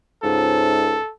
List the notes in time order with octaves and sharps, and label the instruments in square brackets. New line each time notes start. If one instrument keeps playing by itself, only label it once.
[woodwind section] C#2 G#2 [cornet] A4